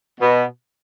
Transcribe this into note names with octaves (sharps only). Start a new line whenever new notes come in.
B2